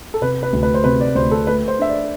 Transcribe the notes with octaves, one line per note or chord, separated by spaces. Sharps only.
A4
C3 B4
B4
D2
B4
C5
C3 B4
D5
D2 C5
A4
A3 B4
C5
D4 E5
D5